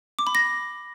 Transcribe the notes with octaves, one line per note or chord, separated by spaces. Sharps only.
D6
B5
A#6